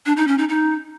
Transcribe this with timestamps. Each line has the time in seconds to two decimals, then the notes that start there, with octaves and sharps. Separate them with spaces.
0.06 D4
0.17 D#4
0.27 C#4
0.38 D#4
0.49 D#4